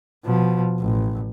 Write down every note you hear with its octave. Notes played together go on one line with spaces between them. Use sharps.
B2 F3
A1